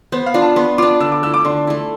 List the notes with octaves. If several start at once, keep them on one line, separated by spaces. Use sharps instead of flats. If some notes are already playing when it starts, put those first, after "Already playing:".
B3 C5
F5
D4 F4
A5
B3 C6
D4 F4 D6
D3 E6
D6
A3 E4 E6
D6
D3 C6
A3 E4